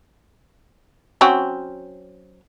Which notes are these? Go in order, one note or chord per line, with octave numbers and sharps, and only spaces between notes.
F#3 C4 C#4